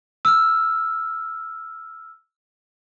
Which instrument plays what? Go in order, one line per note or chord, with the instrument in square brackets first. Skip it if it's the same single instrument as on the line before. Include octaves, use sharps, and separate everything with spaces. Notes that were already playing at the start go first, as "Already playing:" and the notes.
[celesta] E6 F6